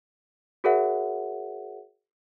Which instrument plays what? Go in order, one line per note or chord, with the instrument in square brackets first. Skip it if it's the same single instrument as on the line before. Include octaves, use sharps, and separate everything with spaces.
[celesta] F#4 G#4 A#4 C#5 E5 F#5